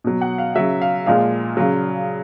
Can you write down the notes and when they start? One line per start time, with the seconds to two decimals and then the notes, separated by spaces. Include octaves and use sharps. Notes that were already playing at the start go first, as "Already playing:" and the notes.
0.04 B2 F#3
0.21 F#5
0.38 F5
0.55 C#3 F#3 E5
0.82 F5
1.06 A#2 F3 G#3 F5
1.57 C#3 F#3